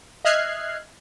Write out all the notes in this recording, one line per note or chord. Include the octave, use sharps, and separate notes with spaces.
D#5 E5 F6 F#6 G#6 C7